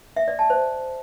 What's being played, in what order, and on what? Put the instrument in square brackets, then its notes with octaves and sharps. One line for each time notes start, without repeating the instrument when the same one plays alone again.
[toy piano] E5
D5
A5
C5